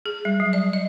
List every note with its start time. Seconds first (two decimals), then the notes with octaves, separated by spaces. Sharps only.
0.06 G#4
0.25 G3
0.40 F#3
0.53 D5
0.73 D#5